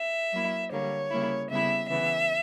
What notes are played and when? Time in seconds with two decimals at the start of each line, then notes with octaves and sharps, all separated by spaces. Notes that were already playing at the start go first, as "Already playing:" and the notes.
Already playing: E5
0.32 F#3 A#3 E4
0.71 D3 G3 A#3 C#5
1.11 C#3 G3 A#3 E4
1.49 C#3 G3 B3 E4 E5
1.89 C#3 E3 B3 E5